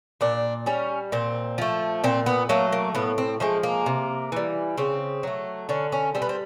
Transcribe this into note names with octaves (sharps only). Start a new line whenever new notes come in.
A#2 D4
G3 C#4
A#2 C4
F3 A3
A#2 C4
B3
F#3 A3 A#3
A#3
A2 B3
C4
F3 G#3 A3
A#3
C3
E3 G3
C#3 C4
F#3 A3
D3 C#4
C#4
G3 C4
B3
C4